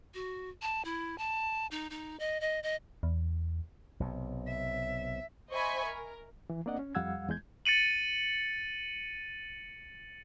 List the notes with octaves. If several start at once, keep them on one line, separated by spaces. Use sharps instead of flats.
F#4
A5
E4
A5
D#4
D#4
D#5
D#5
D#5
E2
B1 C3
E5
C5 D#5 E5 G#5 B5 C#6
A#4
E3
A#3 C4 D4 D5 D#5 F#5
C#4
F2 G3 F5 F#5 E6 G#6
E2 G#3 G6 G#6
A6 C#7 D#7 F#7